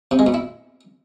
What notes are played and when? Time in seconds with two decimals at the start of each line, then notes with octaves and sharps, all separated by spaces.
0.11 C3
0.19 G#3
0.26 B2
0.34 E4